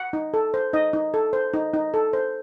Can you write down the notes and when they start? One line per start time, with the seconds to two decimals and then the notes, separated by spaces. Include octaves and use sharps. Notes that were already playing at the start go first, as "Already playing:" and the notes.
Already playing: F#5
0.13 D#4
0.34 A4
0.54 C5
0.73 D#4 D#5
0.93 D#4
1.14 A4
1.33 C5
1.54 D#4
1.74 D#4
1.94 A4
2.13 C5